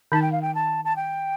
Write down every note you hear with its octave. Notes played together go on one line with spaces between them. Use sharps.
D#3 D#4 A5
G5
F5
G5
A5
A5
G5